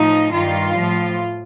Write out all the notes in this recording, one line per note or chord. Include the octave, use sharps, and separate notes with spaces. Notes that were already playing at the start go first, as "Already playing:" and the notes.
Already playing: A2 F3 D#4
G2 D#3 G3 F4
A2 F3